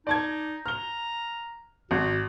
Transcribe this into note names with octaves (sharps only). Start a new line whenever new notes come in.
D#4 D5 A5 G#6
A#5 F6 G7
G#1 F#4